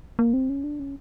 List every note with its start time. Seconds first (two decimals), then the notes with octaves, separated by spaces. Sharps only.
0.19 A#3
0.34 C4
0.50 C#4
0.64 D4
0.80 C#4